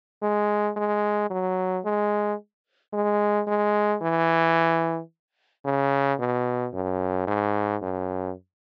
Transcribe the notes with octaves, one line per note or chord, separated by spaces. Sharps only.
G#3
G#3
F#3
G#3
G#3
G#3
E3
C#3
B2
F#2
G#2
F#2